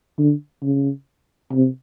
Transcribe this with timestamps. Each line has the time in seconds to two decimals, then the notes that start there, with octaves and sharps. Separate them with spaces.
0.18 D3
0.63 C#3
1.52 C3